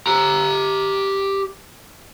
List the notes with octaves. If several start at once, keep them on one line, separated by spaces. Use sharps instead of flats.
G4 A#5